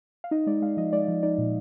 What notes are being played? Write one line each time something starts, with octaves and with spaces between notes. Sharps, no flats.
F5
D#4 D#5
G#3 D5
G#3 F5
F3 D#5
G#3 D5
F3
D#4 D5
A#2